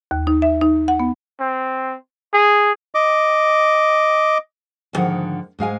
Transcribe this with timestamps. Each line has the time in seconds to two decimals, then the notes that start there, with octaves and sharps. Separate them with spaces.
0.11 D#2
0.27 D#4
0.42 E5
0.61 D#4
0.88 F#5
1.00 B3
1.40 C4
2.34 G#4
2.95 D#5 D6
4.93 D2 G#2 D3 D#3 F3 F#5
5.59 G#2 G#3 F5 G#5